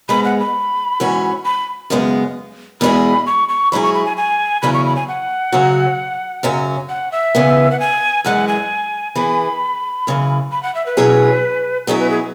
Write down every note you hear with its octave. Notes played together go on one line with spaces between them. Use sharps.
G#2 G#3 B3 B5
F#5
B5
G#2 E3 C#4 F#4
B5
F#2 C#3 G#3 B3
E2 B2 G#3 E4 G#4 B5
C#6
C#6
G#2 F#3 E4 G#4 B5
C#6
B5
G#5
G#5
E2 C#3 F#3 C#4 E4 B5
C#6
B5
G#5
F#5
F#2 C#3 F#3 C#4 F#4
F#2 C#3 F#3 C#4
F#5
E5
C#3 E3 B3
F#5
G#5
F#2 E3 G#3 F#5
G#5
E3 B3 E4 G#4 B5
F#2 C#3 E3
B5
F#5
E5
B4
B2 F#3 C#4 E4 G#4
B2 F#3 C#4 E4 G#4
B4
G#4